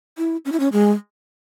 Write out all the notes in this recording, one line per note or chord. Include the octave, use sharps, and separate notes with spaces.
E4
C#4
E4
C#4
G#3